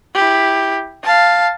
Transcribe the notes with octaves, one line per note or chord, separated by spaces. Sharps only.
E4 G4
F5 A5